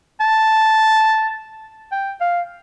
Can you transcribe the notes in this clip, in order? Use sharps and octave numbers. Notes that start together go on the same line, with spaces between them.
A5
G5
F5